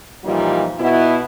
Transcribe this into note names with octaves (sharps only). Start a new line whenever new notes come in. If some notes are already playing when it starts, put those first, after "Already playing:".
A#2 E3 F3 G3 D#4 F4
B2 B3 E4